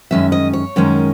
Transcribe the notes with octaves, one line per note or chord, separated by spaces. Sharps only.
F#2 D#3 G#3 C#4 E5
D#5
C#5
F#2 D#3 G#3 C#4